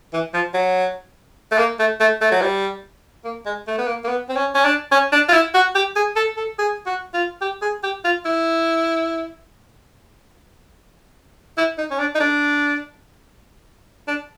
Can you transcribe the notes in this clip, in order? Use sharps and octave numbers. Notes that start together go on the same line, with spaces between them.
E3
F3
F#3
A3
A#3
A3
A3
A3
F#3
G3
A#3
G#3
A3
B3
A#3
A#3
B3
C4
C#4
C#4
D4
C#4
D4
F4
E4
F#4
G4
G#4
A4
A4
G#4
F#4
F4
G4
G#4
G4
F4
E4
E4
D#4
C#4
D4
D#4
D4
D4